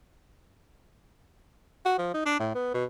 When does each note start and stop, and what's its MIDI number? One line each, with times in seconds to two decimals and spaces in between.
1.85 1.98 66
1.98 2.09 53
2.14 2.22 63
2.26 2.37 62
2.40 2.52 45
2.55 2.71 59
2.74 2.84 47